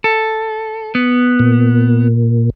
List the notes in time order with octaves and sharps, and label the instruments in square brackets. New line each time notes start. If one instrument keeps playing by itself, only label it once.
[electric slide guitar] A4
B3
[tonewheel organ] A#2